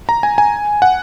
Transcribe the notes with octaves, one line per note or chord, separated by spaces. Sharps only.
A#5
G#5
G#5
F#5